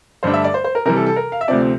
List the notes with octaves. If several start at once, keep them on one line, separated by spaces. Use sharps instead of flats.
G2 D3 A3 D4 C5
E5
D5
C5
C5
A#4
C3 E3 G3 A#4
A4
A4
A#4
F5
E5
D2 C3 F3 C4 D5